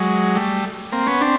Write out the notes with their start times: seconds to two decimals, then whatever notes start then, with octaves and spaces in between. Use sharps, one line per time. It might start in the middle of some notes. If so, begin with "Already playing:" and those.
Already playing: F#3 G#3
0.35 G3 A3
0.92 A#3 C4
1.07 B3 C#4
1.21 C4 D4